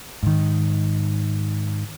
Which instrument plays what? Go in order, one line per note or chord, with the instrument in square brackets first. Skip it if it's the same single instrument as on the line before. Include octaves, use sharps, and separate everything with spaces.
[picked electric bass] G#2 D#3